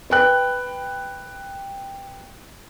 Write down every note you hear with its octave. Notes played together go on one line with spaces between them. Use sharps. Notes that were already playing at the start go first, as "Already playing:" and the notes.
B4 G5 F#6